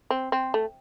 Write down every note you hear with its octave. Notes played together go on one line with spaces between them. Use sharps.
C4
C4
A3